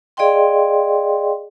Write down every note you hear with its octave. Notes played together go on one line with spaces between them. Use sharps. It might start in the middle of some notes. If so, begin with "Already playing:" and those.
G#4 D5 D#5 F5 G5 C6